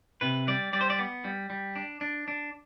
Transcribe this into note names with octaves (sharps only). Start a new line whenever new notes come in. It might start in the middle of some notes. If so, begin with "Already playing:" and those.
C3 B4
G3 D5
G3 D5
C5
D5
B3
G3
G3
D4
D4
D4